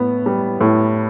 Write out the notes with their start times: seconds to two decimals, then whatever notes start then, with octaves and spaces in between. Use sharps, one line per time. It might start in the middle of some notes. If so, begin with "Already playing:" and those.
Already playing: A2 B3
0.26 G3
0.61 A2